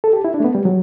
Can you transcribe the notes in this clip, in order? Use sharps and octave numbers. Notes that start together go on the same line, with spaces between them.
A4
G4
E4
D4
A3
B3
G3
F#3